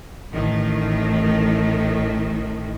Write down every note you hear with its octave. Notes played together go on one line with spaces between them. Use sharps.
A1 A2 D#3